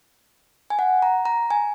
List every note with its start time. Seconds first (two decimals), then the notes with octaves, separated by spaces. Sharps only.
0.70 G#5
0.79 F#5
1.02 A#5
1.25 A#5
1.51 G#5